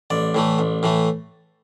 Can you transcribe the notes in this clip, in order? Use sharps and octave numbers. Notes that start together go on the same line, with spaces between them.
A1 D5
A2 E3 A3
A1
A2 E3 A3